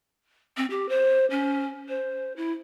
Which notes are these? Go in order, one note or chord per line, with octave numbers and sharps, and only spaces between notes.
C4
G4
C5
C#4
C5
E4